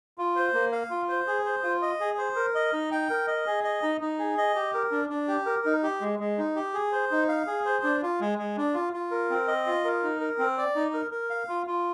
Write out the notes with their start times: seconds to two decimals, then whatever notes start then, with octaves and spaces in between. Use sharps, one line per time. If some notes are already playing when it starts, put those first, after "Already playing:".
0.18 F4
0.36 C5
0.53 A#3
0.72 F5
0.90 F4
1.09 C5
1.27 G#4
1.45 C5
1.63 F4
1.82 D#5
2.00 G#4
2.18 C5
2.36 A#4
2.55 D#5
2.73 D#4
2.92 G5
3.10 A#4
3.27 D#5
3.46 G#4
3.64 D#5
3.83 D#4
4.01 D#4
4.19 G#4
4.38 D#5
4.55 G4
4.74 A#4
4.91 D4
5.09 D4
5.28 G4
5.46 A#4
5.65 D#4
5.83 G4
6.01 G#3
6.19 G#3
6.38 D#4
6.56 G4
6.74 G#4
6.92 C5
7.11 D#4
7.29 F5
7.47 G#4
7.65 C5
7.84 D4
8.02 F4
8.20 G#3
8.38 G#3
8.57 D4
8.74 F4
8.93 F4
9.11 A#4
9.30 C4
9.48 D#5
9.66 F4
9.84 A#4
10.03 D#4
10.20 A#4
10.38 C4
10.58 D5
10.75 D#4
10.94 A#4
11.11 A#4
11.30 F5
11.49 F4
11.67 F4